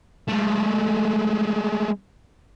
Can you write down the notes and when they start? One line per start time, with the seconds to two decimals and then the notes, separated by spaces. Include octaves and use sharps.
0.29 G#3 A3